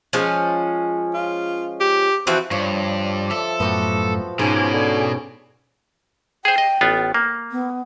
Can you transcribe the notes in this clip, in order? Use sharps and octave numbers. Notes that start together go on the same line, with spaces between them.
F3 G#3 C#4
F4
G4
E3 F3 C4 F#4
G2 F3 C#5 D5
A4 E5
F#2 A2 B3 F#4 G4
G#2 B2 C#4 G#4 G#5 D6
D3
G#4 C5 G5
D#5
A1 B3 F4
A#3
B3